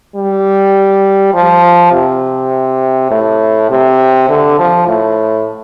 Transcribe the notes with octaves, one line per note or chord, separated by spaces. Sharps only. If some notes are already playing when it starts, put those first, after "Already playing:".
G3
F3
C3
A2
C3
D3
F3
A2